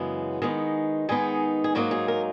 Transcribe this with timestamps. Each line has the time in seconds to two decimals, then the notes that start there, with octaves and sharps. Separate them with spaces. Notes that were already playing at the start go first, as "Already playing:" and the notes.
Already playing: F#2 C#3 E3 G#3 B3
0.42 D#3 G#3 B3 D#4
1.09 D#3 G#3 B3 D#4 G#4
1.64 G#4
1.75 G#2 F#3 A#3 D#4 F#4
1.91 G#4
2.08 A#4